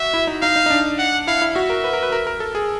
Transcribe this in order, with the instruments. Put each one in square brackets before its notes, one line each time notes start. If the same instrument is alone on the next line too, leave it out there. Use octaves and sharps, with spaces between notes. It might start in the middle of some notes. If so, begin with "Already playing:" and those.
Already playing: [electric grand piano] F#4 [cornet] E5
[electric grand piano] E4
D#4
[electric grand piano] D#4 [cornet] F5
[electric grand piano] D#4
D#4
D4
[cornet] F#5
[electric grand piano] E4 [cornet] F5
[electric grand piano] E4
[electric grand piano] F#4 [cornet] E5
[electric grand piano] A#4
B4
A#4
B4
A#4
A#4
A4
G#4